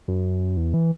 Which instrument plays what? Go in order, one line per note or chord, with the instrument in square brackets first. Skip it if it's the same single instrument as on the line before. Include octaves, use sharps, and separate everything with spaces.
[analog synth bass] F#2
E2
E3